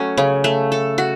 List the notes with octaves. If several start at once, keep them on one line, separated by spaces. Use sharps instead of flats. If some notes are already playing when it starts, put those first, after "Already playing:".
Already playing: F#3 A3 C#4
C#3
A3
A4
F#4